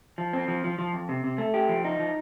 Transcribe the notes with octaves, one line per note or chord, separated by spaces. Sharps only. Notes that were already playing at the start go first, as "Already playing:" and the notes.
F3
C4
F3
F3
F3
F2
C3
C3
A3
G4
F3
D#4
F3